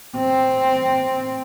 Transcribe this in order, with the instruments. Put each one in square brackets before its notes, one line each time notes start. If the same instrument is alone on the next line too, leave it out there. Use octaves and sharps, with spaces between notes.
[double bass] C4